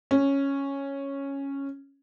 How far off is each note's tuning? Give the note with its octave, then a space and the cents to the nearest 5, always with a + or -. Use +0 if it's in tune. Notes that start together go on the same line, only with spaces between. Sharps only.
C#4 -5